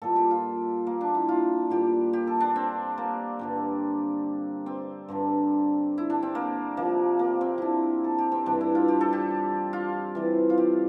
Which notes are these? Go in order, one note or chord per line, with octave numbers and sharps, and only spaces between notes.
A#2 G3 A4
G4
F4
A#3
D4
E4
F4
A#2 G3 G4
G4
A4
D4
C4
A#3
G2 D3 G3
C4
G2 D3 G3
E4
D4
C4
A#3
C3 F3 A#3
A#3
C4
D4 E4
A4
G4
C4
G2 E3 G3 D4
E4
F4
G4
A4
G4
F4
C3 E3 G3
F4
G4